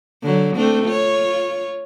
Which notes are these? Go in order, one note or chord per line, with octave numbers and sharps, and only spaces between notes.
D3 F#3
A3 C4 D4
F4 C#5